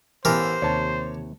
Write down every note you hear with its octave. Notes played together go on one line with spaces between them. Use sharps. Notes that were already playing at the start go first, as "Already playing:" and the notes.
A1 E3 B3 G4 A#4 C5
D#2 C3 C#5 A5